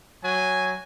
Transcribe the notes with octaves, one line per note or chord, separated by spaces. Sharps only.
F#3 G#5